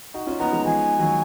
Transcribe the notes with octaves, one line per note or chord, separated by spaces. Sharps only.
D#4 F#4
C#4 F4
B3 D#4 A#5
F3 G#3
F3 G#3 G#5
D#3 F#3